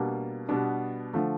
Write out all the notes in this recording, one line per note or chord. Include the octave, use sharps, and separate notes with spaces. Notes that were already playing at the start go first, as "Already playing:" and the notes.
Already playing: B2 G3 A#3 D4
B2 G3 B3 D4
D3 F3 A3